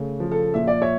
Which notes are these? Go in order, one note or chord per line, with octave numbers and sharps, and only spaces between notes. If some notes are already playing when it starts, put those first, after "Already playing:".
Already playing: C#3 A3
F3
A4
A#2 E5
D5
C#5 E5